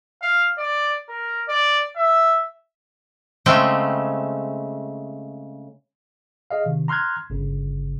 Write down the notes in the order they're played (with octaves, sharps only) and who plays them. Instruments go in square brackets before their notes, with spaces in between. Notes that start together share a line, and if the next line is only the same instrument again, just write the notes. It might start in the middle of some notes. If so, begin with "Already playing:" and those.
[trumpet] F5
D5
A#4
D5
E5
[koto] C#3 G#3 A3 C4 C#4 G5
[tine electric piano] G#4 D#5 F5
C3 D#3
A#5 C6 F6 F#6 G#6
G1 C#3